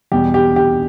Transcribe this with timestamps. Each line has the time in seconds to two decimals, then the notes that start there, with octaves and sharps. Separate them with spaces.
0.12 E2 B2 G3 G4
0.34 G4
0.56 G4